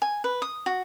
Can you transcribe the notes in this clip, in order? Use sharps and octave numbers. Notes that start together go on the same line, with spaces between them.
G#5
B4
D#6
F#4